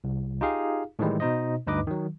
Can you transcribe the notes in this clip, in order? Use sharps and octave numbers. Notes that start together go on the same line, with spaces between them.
C2
D#4 F4 G4 G#4 F5
A2 D#3 E3 G3 G#3
B2 D#4 C5 D#5
D2 G2 D#4 B4 D#5 D6
D#3 F#3